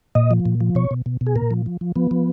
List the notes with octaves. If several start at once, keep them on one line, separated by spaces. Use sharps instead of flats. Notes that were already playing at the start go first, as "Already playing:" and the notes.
A#2 D#5
F3
A#2
F3
B2 C#5
B2
B2
B2
G#4
A#2 A#4
F3
F3
F3
F3 B3
F3